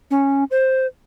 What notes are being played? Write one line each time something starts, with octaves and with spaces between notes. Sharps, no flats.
C#4
C5